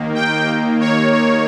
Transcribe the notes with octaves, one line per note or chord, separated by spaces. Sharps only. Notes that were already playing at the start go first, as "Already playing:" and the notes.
Already playing: D#2 D#3 A#3
G5
C#5
C#5